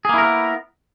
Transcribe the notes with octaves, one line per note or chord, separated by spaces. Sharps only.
A#3 B3 E4 G#4 A#4